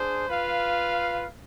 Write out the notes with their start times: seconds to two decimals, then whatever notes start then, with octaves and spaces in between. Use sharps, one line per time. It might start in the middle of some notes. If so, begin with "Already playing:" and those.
Already playing: D4 G#4 C5
0.28 F4 B4 F5